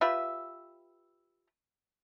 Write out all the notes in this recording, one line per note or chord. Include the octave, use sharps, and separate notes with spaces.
F4 G4 B4 E5